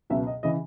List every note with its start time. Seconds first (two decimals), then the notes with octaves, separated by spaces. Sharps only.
0.10 C#2 B2 F#3 E5
0.27 D#5
0.43 C#3 E3 D#5